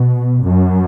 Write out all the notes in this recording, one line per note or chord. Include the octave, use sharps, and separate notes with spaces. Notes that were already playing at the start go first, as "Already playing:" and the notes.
Already playing: B2
F#2